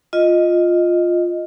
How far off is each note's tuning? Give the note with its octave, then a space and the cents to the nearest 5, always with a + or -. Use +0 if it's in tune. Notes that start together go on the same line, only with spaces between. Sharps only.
F4 +5 D#5 +0